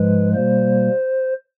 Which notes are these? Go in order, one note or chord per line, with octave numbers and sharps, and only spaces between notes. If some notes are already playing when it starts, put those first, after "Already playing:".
Already playing: G#2 F3 G#3 B4
B2 G3 A#3 C5